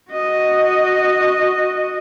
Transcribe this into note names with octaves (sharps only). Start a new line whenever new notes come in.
F#4 D#5